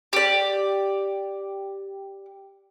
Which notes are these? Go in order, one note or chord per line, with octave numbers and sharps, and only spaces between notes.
G4 D5